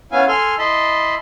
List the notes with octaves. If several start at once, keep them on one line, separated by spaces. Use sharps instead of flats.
B3 C#4 E4 F5 G#5
A4 G#5 C6 F6
E4 D#5 A5 B5 C6